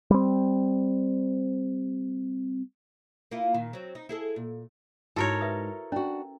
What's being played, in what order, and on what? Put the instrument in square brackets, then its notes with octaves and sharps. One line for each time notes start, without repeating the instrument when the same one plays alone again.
[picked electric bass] G3 C4
[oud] A#3 E4 F4
A#2 D#3
F#3 C4
D#4
E4 G#4 A4
A#2
[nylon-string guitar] G#2 [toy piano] E4 F#4 [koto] A4 A#4 C#5
[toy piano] B4 E5 D#6
[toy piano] C#4 [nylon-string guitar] D4 F#4